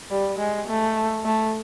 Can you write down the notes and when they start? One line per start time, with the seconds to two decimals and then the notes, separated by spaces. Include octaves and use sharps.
0.10 G3
0.39 G#3
0.68 A3
1.25 A3